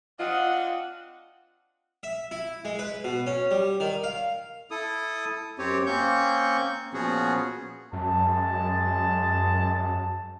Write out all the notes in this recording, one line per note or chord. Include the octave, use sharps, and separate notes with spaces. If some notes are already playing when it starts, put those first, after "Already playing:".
C4 D4 F4 D#5 F#5
E5
E4
G#3
B4
B2
C#4
G3
D#3
F5
E4 A4 D#6
F#2 C4 G4 C#5
A#3 C4 C#4 C#6 G6
A#2 F3 B3 C#4 F#4 G#4
F#2 G#3 A5